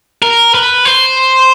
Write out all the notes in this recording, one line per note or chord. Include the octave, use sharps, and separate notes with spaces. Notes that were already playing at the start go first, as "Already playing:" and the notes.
A#4
B4
C5